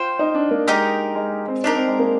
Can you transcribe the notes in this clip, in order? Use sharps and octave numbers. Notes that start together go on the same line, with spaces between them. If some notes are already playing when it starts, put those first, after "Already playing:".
Already playing: F4 C5 G5
D#4
D4
A#3
G#3 D#4 G4 A#4
G#3
C4
D4 D#4 G4 A#4
C4
G#3
A#3